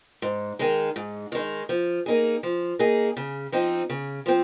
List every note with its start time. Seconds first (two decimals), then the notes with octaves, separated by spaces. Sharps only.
0.22 G#2
0.59 D#3 G#3 D#4
0.96 G#2
1.32 D#3 G#3 D#4
1.69 F3
2.06 A#3 D#4 G#4
2.43 F3
2.79 A#3 D#4 G#4
3.17 C#3
3.52 F3 C4 D#4
3.90 C#3
4.26 F3 C4